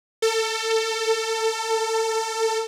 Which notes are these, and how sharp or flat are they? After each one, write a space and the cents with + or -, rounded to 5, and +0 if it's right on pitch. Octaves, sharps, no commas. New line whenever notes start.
A4 +25